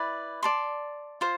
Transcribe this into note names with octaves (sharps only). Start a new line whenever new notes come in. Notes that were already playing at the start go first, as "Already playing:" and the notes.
Already playing: E4 B4 D5
D5 A5 C6
F4 C5